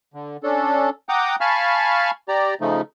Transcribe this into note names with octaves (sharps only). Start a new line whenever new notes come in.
D3
C#4 D4 A4
F#5 G5 A#5 D6 D#6
F5 G#5 A5 B5 C#6 F6
G4 D5 A#5
C#3 F3 A3 D#4